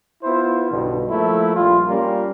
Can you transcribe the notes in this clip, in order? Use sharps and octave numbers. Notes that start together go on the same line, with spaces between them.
B3 E4 F4 C5
B1 G2 B2 D3
F3 A3 A#3 E4
A#1 G3 F4
G3 A#3 C#4 F4